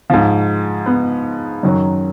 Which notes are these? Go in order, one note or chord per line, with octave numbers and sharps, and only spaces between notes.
G#2 F3
B3
F#2 D#3 F#3